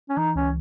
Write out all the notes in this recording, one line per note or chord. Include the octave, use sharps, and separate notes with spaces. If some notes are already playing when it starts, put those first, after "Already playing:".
C#4
E3 D#4
C#2 C#4